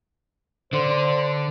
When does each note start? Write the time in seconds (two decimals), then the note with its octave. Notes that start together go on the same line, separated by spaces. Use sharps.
0.73 D3 C5